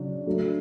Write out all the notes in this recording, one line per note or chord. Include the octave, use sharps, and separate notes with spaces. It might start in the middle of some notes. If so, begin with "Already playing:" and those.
Already playing: C#3 F#3 D4
F#3 A3 D4